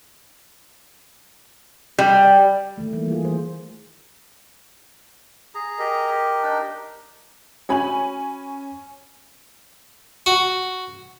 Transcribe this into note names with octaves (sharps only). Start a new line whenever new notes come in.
G3
D#3 A3
E3 G3 A#3
F4 G#4
E3 C5
G#4 A#5
G4 A#4 D#5
D4 D#4
C#4 F#4 C#5 G#5 B5 F#7
F#4